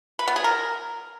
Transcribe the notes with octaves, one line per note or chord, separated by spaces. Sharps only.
B4
B3
G#4
A#4